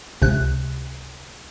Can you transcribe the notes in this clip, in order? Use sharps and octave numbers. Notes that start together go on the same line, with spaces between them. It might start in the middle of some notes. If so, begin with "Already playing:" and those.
C#2 C3 F#6